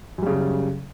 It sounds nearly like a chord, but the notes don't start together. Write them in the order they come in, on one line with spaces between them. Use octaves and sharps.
F#2 G3 C#3